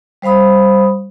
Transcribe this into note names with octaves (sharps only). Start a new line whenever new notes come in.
G3 C5 F5 B5 D#6